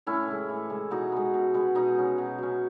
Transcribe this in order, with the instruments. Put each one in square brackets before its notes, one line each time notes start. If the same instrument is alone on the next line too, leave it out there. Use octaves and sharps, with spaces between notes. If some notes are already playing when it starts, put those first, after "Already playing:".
[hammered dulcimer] A2 C#4 E4
E3 G#3
A2
E3 G#3
B2 D#4 F#4
G#3 B3
B2
G#3 B3
B2 D#4
F#3 C#4
B2
F#3 C#4